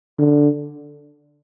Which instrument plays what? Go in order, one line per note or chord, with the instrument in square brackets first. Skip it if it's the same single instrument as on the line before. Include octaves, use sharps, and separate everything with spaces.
[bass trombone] D3